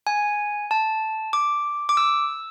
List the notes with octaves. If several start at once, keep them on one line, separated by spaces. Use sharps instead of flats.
G#5
A5
D6
D6
E6